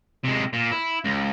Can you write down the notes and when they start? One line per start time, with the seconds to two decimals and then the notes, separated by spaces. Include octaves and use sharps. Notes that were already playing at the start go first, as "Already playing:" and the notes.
0.24 C3 G#3
0.53 A#2
0.71 E4
1.04 C#2